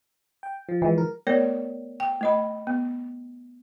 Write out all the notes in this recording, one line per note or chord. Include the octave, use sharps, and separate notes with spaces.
G5
F3
E3 F3 G#3
A#4
A3 B3 A#4 C#5 D5
G5
A3 D#5 B5
B3